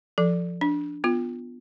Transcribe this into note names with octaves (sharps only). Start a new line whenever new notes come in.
F3 A4
D4
B3 F4